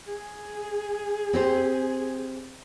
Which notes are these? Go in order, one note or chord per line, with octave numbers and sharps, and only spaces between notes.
G#4
C4 G4 C5